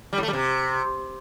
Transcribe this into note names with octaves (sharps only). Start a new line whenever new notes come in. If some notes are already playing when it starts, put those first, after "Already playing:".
G3
A2
A3
G3
C3